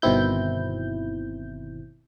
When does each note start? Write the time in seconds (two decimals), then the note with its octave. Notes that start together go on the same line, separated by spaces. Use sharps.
0.02 G1 B2 D#3 C4 E4 G6